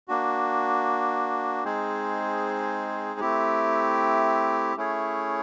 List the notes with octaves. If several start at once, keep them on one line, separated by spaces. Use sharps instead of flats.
A#3 D4 F#4
G#3 C4 D#4 G#4 C5
A3 C4 E4 G4
A3 C#4 E4 G#4 C#5